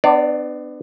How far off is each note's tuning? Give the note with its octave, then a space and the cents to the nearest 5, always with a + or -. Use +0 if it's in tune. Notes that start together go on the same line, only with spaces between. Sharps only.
B3 +35 D4 +30 D5 -25